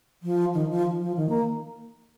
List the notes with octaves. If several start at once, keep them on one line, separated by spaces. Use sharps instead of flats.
F3
D#3
F3
F3
D#3
A#3